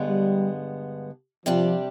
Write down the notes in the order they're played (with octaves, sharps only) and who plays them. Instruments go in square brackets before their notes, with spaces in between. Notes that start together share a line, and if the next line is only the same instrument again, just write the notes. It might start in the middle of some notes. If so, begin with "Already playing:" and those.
Already playing: [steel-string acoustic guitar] G2 D3 G#3 B3
[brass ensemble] G3
[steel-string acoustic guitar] C3 G3 D4 [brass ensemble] F3